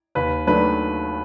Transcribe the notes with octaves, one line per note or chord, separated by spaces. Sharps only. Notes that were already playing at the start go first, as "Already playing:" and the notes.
D#2 B4
D#3 F#3 A3 D4 B4